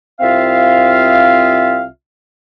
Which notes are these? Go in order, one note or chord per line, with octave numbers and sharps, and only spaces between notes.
C2 C4 F4 E5 F5